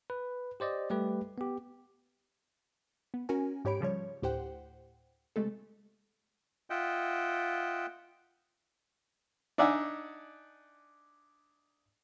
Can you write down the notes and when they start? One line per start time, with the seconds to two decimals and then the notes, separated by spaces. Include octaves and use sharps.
0.10 B4
0.60 G4 C5 D5 D#5
0.90 G3 A3 G4 B4
1.38 B3 G4
3.14 B3
3.29 C#4 F#4 A#4 G#5
3.65 G#2 G4 C#5 B5 D7
3.81 C#3 F3 G3 C#5
4.22 D2 A2 G4 C5 F#5 G5
5.36 C3 G#3 A3 A4
6.70 F4 D#5 E5 F#5 G5
9.58 D4 D#4 D5 E5 F#5 G#5